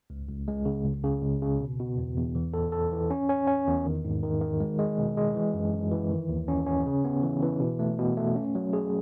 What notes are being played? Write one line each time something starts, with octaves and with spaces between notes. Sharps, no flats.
C#2
C#2
G#3
C#3
C#2
C#3
C#2
C#3
B2
B2
E2
E2
E3
A4
A4
E3
C#4
C#4
C#4
E2
D#3
G#2
D#3
D#3
G#3
G#3
B2
G#3
E3
F#2
F#2
E3
D#3
D#2
C#4
C#4
C#3
B3
E3
E3
B2
A3
B2
A3
C#4
F#3
G#4